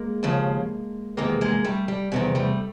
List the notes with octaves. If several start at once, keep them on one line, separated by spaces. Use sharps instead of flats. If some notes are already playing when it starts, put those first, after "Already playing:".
Already playing: G#3 A#3
D#2 C#3 F3
E2 C3 D#3 G#3 A#3
G#3 A#3
G3 A3
G3
E2 C3 D#3 G3
G3 A3